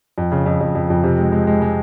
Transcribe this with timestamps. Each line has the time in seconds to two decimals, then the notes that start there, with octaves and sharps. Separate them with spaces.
0.18 F2
0.32 C#3
0.46 F2
0.61 F2
0.75 F2
0.90 F2
1.03 C3
1.18 G#3
1.32 G#3
1.47 G#3
1.62 G#3